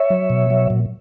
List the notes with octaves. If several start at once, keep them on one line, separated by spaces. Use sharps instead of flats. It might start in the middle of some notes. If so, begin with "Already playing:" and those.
Already playing: C#5 E5
F#3
B2
F#3
A#2